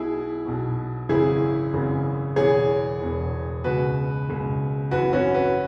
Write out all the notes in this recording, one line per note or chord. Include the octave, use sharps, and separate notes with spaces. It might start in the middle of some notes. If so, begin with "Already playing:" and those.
Already playing: B1 B2 E4 G#4
B1 B2
G#1 F#2 C#3 E3 E4 G#4
G#1 F#2 C#3 E3
E1 E2 E3 G#4 C#5
E1 E2 E3
C#2 B2 F#4 B4
C#2 B2
G#1 F#2 E3 F#4 B4
C#4 F#4
F#4 B4